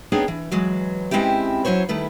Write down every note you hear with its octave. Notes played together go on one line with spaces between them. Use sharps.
B3 C4 D4 D#4 G#4 C#5
E3
E3 F#3 G#3
G#3 C4 C#4 E4 G4
F#3 C#4 E4 C5 C#5
D#3 G3 A3 E4 B4